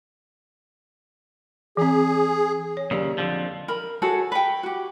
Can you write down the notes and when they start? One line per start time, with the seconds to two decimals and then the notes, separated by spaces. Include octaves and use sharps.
1.77 E3 C4 G#4
2.77 C#5
2.91 D#2 C#3 F#3 G4 D5
3.18 F2 D3 F3
3.68 A#4 B5
4.02 F#4 G#4 A4 C#5
4.32 B4 G5
4.63 F#4 G4